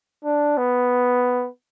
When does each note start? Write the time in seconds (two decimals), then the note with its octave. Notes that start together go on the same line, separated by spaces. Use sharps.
0.24 D4
0.57 B3